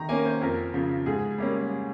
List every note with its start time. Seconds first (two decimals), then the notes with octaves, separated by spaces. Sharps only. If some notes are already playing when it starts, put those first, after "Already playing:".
Already playing: D#3 A#5
0.09 A#3 C#4 G#5
0.25 C5
0.41 F2 A#4
0.74 C#3 F3
1.06 G#2 G#4
1.38 G3 A#3 C#4